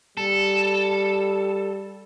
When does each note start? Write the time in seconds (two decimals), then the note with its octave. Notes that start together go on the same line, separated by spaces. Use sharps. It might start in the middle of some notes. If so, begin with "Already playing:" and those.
0.17 G3 A4